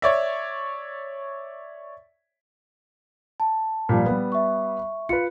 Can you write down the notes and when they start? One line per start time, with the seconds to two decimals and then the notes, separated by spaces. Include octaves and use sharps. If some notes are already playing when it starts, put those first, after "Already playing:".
0.02 C#5 D5 E5
3.40 A5
3.89 A#2 F3 G3
4.06 G3 B3
4.32 E5 C#6
5.09 F4 B4 F5 C#7